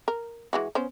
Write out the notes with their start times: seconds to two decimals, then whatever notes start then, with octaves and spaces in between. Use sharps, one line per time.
0.08 A#4
0.53 E3 G#3 F#4
0.75 B3 C#4 C5